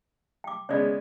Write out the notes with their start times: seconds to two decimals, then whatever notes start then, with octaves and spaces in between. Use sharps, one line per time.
0.44 G5 D6
0.69 C#3 G#3 B3 C#5 D5